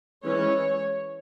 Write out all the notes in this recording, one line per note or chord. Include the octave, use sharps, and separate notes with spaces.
E3 G#3 C#4 C#5